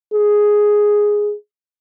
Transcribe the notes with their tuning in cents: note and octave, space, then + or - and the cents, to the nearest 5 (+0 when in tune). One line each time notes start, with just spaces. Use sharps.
G#4 +0